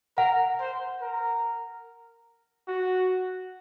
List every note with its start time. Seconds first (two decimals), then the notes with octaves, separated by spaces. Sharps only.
0.18 A#4 F#5
0.60 C5
1.01 A#4
2.68 F#4